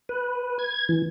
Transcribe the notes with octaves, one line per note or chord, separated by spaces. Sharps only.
B4
G#6
E3